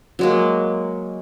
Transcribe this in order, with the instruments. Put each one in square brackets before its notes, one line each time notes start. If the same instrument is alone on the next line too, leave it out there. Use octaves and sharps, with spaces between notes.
[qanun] F#3 G#3 A#3